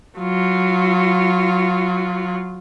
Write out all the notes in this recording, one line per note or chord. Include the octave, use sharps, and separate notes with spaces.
F#3 F4